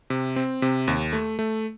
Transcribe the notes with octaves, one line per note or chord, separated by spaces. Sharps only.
C3
C4
C3
D#2
A3
A3